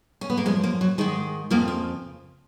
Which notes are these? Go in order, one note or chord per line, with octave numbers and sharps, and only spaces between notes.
C#4
B3
A#3
F#2 F3 G#3
A#3
F#3
G#2 D#3 G#3
F2 C#3 F3 A#3
F4